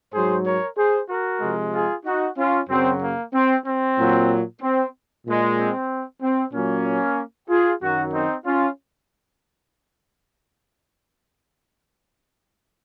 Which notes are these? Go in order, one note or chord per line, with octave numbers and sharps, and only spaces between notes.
G#2 F#3 G#4 C5
A#4 C#5
G#4 C5
F#4 A#4
C3 F3 G#3
F4 G#4
D#4 F#4
C#4 F4
F#2 C#3 F#3 C4
A#3
C4
C4
A#2 F#3
C4
A#2 G#3
C4
C4
A#2 F#3 A#3 C#4
F4 G#4
F#2 D#3 F#3 D#4 F#4
C4 D#4
C#4 F4